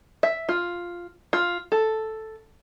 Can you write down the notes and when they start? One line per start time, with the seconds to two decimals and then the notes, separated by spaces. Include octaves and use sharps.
0.23 E5
0.49 F4
1.33 F4
1.72 A4